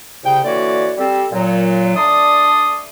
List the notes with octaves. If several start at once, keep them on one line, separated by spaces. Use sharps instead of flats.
C2 C#3 G5
D3 E3 A#3 F#4 C#5 D5
G3 C4 A4
A#2 F#3
A3 D4 D5 A5 C6 D#6